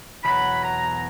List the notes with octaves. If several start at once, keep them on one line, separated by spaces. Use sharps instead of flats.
E2 B2 F#3 B5
A#5